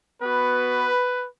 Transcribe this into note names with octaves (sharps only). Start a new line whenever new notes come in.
B3 F#4 B4